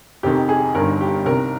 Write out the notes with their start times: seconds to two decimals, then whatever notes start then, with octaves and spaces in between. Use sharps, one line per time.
0.23 F1 F2 D#3 G4
0.49 G#4
0.75 G1 G2 D#3 A#4
1.01 G4
1.25 C2 C3 D#3 A#4